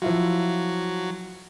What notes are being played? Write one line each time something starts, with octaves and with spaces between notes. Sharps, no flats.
F3 F#3 E4 F4